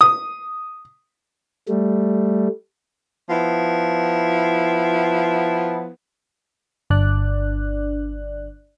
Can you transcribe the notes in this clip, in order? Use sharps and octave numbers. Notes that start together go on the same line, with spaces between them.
D#6
G3 A3
F3 B3 E4
G1 D4 D5 F#6